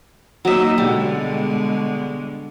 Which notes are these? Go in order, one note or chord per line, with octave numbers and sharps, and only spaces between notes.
F#3 A#3 D#4 D#5 E5
B2 D3 G3 G#3